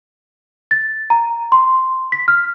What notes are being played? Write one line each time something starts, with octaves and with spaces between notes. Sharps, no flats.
A6
A#5
C6
B6
F6